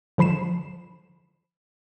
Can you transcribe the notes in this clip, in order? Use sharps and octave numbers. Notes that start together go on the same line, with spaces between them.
D3 F3 B5 C7 E7